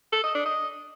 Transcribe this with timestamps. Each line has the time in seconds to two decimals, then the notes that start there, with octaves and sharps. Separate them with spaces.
0.13 A4
0.24 D#5
0.35 D4
0.46 D#5